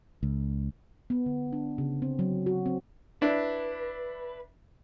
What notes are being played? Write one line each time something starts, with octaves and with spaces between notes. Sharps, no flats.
C#2
B3
D3
D4
C#3
C4
F#3
F#4
C4
D4 E4 B4